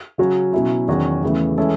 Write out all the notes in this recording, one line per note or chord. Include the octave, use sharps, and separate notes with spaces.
C#3 F#3 C#4 F#4
B2 F#3 C#4 E4
E2 D#3 F#3 C#4 F#4
E2 C#3 E3 A3
E3 G#3 C#4 E4 A4